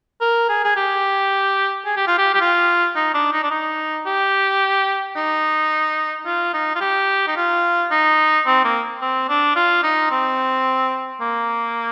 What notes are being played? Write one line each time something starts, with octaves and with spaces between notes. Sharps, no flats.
A#4
G#4
G#4
G4
G#4
G4
F4
G4
G4
F4
D#4
D4
D#4
D4
D#4
G4
D#4
F4
D#4
F4
G4
D#4
F4
D#4
C4
A#3
C4
D4
F4
D#4
C4
A#3